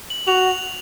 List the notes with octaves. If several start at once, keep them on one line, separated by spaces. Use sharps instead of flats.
F#7
F#4 F7